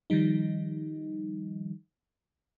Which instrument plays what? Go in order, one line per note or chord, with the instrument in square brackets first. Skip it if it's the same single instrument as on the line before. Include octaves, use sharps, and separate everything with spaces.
[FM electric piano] D#3 F3 G3 D#4